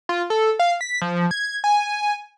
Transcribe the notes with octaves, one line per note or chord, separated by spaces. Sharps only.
F4
A4
F5
B6
F3
G#6
G#5